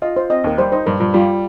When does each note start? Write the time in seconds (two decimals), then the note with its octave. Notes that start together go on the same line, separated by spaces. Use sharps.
0.02 F4 D#5
0.16 F4 C5
0.30 C4 D#5
0.44 D#2 A#4
0.58 G3 C5
0.72 D#4 C5
0.86 G2 A#4
1.00 G2 F4
1.14 G3 F4